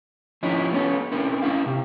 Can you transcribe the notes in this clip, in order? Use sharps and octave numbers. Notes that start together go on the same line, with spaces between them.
F3 C#4 D#4 E4
B3 C#4 A4
C4 C#4 E4 A#4
C#4 E4 F5
C3